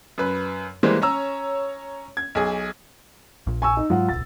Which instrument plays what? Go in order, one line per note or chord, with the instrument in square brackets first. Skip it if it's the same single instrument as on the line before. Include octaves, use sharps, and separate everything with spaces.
[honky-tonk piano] F#2 B4
E3 G3 G#3 A#3 C5
C#4 C#5 A#5 E6
G#6
B1 G#4
[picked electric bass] A#1 A#2
[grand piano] G#5 C#6 E6
D#4
[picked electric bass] G#2 F#3 G#3 [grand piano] F4 F#5
[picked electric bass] D1 B1 [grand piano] A6